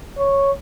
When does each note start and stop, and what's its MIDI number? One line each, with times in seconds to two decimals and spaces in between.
0.18 0.52 73